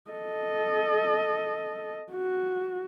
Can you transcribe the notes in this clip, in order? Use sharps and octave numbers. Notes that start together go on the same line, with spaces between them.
A4 D#5
F#4